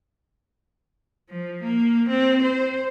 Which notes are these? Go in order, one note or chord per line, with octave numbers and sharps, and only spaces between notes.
F3
A#3
C4
C5